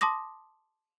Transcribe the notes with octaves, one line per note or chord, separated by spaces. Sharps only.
A5 C6 D6 D#6 A#6